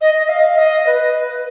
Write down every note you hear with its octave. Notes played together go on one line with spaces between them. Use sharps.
D#5
D#5
F5
D#5
B4